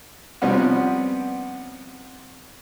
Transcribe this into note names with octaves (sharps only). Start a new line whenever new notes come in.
C3 F3 G3 B3 C#4 F#4